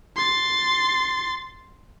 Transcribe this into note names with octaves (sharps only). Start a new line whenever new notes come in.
C6 A6